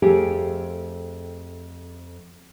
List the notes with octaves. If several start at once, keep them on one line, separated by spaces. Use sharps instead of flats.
F2 A3 G4 G#4